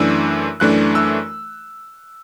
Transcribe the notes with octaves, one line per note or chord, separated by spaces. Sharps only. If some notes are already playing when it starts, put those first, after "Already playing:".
Already playing: F#2 E3 A3 D4 E6
F#2 E3 A3 D4 F#6
E6